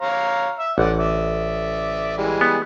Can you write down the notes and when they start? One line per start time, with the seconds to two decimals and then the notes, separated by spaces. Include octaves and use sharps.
0.01 C#5 F5 A#5
0.59 E5 E6
0.78 A1 D5 F#5
0.98 D5 E5
2.18 E3 G3 G#3
2.41 B3